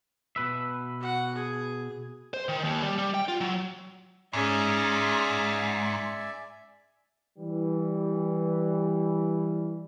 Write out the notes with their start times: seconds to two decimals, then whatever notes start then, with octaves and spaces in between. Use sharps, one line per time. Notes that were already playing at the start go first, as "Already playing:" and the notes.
0.36 B2 B4 E5
1.00 F#4 F#5
1.35 G#4
2.34 C5
2.49 D#3
2.64 D#2
2.83 G3
2.98 G3
3.14 G5
3.28 F4
3.41 F#3
4.33 G#2 C#4 G#4 D5 E5 G#5
7.38 E3 G3